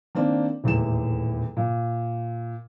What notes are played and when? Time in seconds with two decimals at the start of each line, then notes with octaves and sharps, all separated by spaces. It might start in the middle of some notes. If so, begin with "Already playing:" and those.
0.15 D#3 A#3 C4 D4
0.64 D#1 E2 A2 E7
1.57 A#2